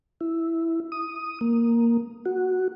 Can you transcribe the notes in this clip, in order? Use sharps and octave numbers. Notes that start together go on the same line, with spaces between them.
E4
D#6
A#3
F#4